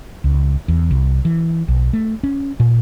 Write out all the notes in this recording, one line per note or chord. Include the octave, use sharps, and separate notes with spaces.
C#2
E2
C2
E3
B1
A3
C#4
A#2